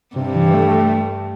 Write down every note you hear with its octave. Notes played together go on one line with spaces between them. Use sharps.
G2 C3
E3
A3